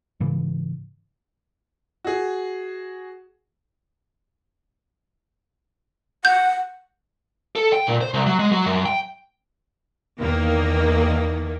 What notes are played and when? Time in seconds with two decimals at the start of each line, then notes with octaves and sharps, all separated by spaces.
0.20 G#2 C#3 E3
2.04 F#4 G#4
6.25 F#5 G6
7.56 A4
7.73 G5
7.87 A#2
8.01 C5
8.14 C2
8.27 F#3
8.39 G#3
8.52 F#3
8.66 F#2
8.86 G5
10.19 E2 D#3 A#3